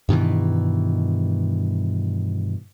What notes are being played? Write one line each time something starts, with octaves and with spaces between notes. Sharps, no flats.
G2 B2 D#3 E3